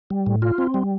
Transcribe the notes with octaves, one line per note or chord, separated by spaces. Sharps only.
G3
A2
F4
C4
G3